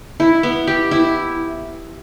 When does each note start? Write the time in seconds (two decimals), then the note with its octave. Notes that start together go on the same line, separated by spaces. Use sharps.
0.20 E4
0.43 B3
0.67 G4
0.91 E4